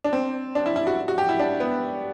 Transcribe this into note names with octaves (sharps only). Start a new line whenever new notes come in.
D4
C4
D4
E4
E4
F#4
F#4
G4
E4
D4
B3